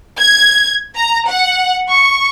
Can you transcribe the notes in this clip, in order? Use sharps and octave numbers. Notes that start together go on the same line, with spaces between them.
G#6
A#5
F#5
C#6